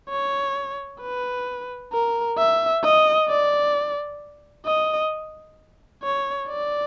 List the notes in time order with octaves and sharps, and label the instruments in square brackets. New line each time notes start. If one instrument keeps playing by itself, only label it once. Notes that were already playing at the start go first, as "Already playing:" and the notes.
[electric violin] C#5
B4
A#4
E5
D#5
D5
D#5
C#5
D5